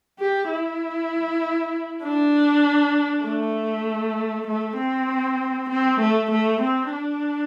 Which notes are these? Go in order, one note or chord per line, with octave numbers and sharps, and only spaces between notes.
G4
E4
D4
A3
A3
C4
C4
A3
A3
C4
D4